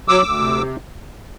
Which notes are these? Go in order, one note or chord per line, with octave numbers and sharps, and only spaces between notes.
F#3 D6 E6
D2
C3